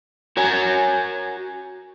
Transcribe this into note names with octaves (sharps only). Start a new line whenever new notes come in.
F#4 A#4 C#5 F#5 G#5